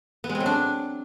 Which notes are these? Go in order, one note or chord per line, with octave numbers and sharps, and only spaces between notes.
B3
G#3
C4
F#3
D4